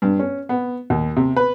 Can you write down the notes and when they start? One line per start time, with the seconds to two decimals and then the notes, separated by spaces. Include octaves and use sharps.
0.02 G2
0.19 C#4
0.49 B3
0.90 D#2
1.17 C3
1.36 B4